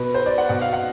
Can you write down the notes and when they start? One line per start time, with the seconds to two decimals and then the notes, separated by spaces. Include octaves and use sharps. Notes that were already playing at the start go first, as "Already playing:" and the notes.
Already playing: B2 B4
0.14 C5
0.26 D5
0.38 F#5
0.49 B2 F#5
0.61 F5
0.73 F#5